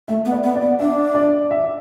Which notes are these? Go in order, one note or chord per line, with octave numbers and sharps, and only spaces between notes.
A3 E5
B3
D5
B3
D5
B3
D4 E5
D5
E5